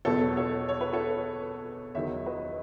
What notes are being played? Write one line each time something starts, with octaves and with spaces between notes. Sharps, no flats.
E2 B2 F#3 B3 A4 C#5
A4 C#5
C#5
B4
A4 C#5
E2 D#3 F#3 C#5 E5
B4 D#5